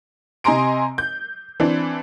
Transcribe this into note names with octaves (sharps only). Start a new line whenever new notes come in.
C3 D#5 G#5 A#5 C6 D7
G6
E3 C4 D4